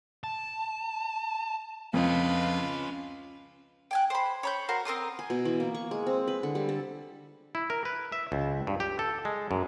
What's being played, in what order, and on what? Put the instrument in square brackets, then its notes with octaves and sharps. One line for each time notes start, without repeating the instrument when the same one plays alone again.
[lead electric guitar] A5
[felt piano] F2 [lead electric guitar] C#4 D#5 [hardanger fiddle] F4 B4
[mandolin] G5 G#5 F#6
C5 B5
C#5 B5 G6
F#4 A#4 C5
C4 A#4 C6 D#6
[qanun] G#5
B2
E3
A#3
C#6
G#3
C4
B4
D3
G3
A4
[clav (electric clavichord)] E4
A#4
B4
E5
C#2
G2
G4
A4
G#3
F#2